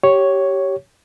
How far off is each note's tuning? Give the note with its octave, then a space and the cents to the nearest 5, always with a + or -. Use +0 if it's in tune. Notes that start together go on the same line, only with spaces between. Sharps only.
G4 -15 C#5 +0